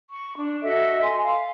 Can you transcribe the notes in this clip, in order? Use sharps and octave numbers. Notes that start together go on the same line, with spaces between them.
C#6
D4
F#4 A4 D#5 E5
G#5 C6
F5